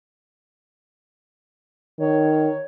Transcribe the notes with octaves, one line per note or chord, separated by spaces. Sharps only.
D#3 C#5